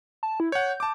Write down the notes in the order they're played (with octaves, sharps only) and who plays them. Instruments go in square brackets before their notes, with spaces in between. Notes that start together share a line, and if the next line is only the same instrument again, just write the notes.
[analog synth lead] A5
E4
[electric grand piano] C#5 F#5 [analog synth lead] G6
[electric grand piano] A5 D6